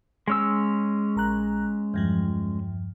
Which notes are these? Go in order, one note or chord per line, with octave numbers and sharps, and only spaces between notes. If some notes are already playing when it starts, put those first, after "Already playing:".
G#3 C#4 E6
A#1 A#5 F#6
E2 G2 F3